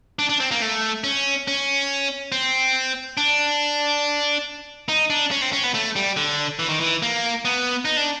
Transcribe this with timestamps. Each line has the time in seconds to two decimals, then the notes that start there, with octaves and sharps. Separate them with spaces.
0.19 D4
0.29 D4
0.40 C4
0.51 A#3
0.62 A3
1.04 C#4
1.48 C#4
2.32 C4
3.17 D4
4.89 D#4
5.10 D4
5.31 C#4
5.42 C4
5.53 C#4
5.64 B3
5.74 A3
5.96 G3
6.17 D3
6.59 E3
6.69 D#3
6.80 E3
7.02 A#3
7.45 B3
7.85 D#4
7.97 D4